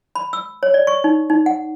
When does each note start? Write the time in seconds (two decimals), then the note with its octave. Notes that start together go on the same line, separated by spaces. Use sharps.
0.15 B5
0.33 E6
0.63 C#5
0.74 D5
0.87 C#6
1.04 D#4
1.30 D#4
1.46 F#5